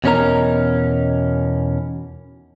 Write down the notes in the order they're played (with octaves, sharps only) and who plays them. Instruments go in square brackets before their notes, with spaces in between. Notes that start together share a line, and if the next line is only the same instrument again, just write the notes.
[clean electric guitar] E2 B2 C#4 D#4 A#4 A#5